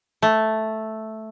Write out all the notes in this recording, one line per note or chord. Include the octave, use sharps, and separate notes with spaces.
A3